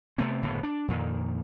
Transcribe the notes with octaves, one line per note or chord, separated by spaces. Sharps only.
C3 A3 B3 C4
F#1 A2 D3 B3
D4
F2 A#2 D#3